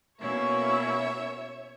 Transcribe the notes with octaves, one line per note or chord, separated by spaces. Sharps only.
B2 A#3 C#4 E4 C#5 E5